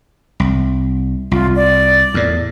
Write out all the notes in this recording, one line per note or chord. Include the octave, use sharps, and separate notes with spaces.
C2
C2 F4
D5
E2 A2